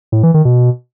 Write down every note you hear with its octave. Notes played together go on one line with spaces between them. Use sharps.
A2
E3
D#3
B2